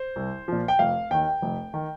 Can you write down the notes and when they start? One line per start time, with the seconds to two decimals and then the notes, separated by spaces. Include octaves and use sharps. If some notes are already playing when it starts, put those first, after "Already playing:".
Already playing: C5
0.16 C2
0.48 A#2 F3
0.68 G5
0.79 F1 F5
1.11 D#2 D#3 G5
1.42 F1
1.74 D#3